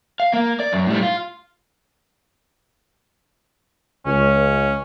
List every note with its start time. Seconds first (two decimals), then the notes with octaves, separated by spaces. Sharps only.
0.20 F5
0.33 A#3
0.60 D5
0.73 F#2
0.87 A2 G3
1.03 F4
4.06 C#2 C#4